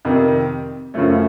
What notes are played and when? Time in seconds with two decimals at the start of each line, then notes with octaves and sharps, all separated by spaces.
0.05 F2 C3 D#3
0.94 F#2 C#3 F3 A3 C#4